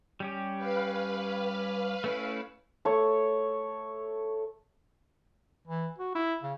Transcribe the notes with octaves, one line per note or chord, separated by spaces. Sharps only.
G3 C#4 G4
B4 F5
A3 C#4 E4
A3 C#5
E3
F#4
E4
C#3